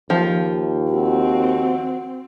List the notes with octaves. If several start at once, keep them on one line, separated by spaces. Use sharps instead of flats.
D#2 F3
C4 F#4